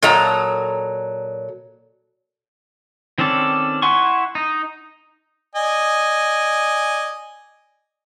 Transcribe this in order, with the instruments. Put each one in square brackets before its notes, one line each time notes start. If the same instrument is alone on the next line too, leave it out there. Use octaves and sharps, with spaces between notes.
[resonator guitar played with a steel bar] A#2 F#3 A4 D#5 A#5
[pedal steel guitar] D#3 C4 C#4 A4 D5
E4 F#5 G#5 C6 C#6
D#4
[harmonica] D5 D#5 G#5